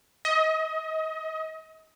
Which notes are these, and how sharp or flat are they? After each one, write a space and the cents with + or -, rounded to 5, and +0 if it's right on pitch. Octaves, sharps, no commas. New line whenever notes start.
D#5 +30